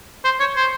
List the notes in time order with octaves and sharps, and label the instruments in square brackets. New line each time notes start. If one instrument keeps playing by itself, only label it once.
[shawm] C5
C#5
C5